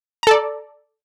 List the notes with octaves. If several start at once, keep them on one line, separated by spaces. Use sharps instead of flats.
A4 D5 A#5